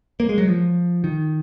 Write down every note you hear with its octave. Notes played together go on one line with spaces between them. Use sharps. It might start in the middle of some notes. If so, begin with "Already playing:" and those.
A#3
G#3
F#3
F3
D#3